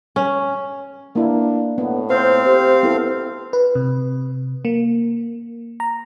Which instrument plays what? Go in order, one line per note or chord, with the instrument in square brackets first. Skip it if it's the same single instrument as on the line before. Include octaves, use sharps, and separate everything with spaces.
[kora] C#4
[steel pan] A#3 E4 [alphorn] D4
[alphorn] A2 [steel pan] B3
[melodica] C4 F5 [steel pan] C5
[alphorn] G4 [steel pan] C5
[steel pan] B3 E4 A4
[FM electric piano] B4
C3
A#3
A#5